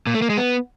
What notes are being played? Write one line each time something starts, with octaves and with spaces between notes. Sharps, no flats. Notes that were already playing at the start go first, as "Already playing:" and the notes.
A#2
A3
A#3
G#3
B3